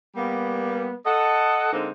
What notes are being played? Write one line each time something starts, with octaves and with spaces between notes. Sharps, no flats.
G3 A#3 B3
A4 D#5 F#5
D3 G#3 A#3 C4 D#4 C5